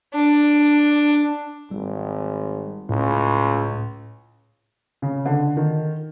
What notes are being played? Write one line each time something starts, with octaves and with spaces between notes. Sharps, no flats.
D4
G#1 G3
C#2 A2
C#3
D3
D#3